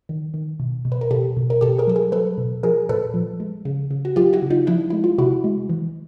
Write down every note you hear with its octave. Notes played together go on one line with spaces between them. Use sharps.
D#3
D#3
B2
B2
B4
A#4
B2 G4 A4
B2
A#4
B2 G4 A4
G#4 A#4
F#3 A4
G#4 A#4
F#3 A4 B4
B2
F3 G#4 A#4
A#2 A4 B4
F3
G#3
C#3
C#3
F#4
F#3 F4 G4
E4 F#4
C#3
D#4 F4
F3 D4 E4
G#3 E4
F4
C3 E4 F#4
G#3
E3